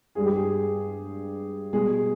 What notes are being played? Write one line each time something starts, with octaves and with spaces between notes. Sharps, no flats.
G2 G3 G#4
G4
G#4
B2 G3 G#4